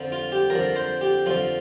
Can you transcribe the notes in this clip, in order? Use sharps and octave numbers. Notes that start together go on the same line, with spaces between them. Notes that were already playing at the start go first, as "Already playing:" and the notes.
Already playing: F2 D3 F3
F4
G4
F2 D3 F3 A#4
C5
G4
F2 D3 F3 F4